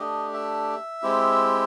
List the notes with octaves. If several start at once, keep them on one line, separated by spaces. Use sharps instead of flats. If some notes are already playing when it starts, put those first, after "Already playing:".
Already playing: A3 D4 G4 D#5
E5
G#3 C4 E4 G4